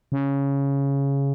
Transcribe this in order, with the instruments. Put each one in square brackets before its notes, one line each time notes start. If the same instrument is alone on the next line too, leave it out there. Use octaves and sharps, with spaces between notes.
[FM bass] C#3